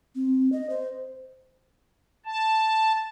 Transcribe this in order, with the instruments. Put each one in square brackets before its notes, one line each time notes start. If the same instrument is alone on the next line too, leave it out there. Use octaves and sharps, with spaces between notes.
[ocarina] C4
D#5
C5
[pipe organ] A5